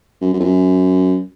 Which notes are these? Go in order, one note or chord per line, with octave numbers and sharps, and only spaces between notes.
F#2
F#2
F2
F#2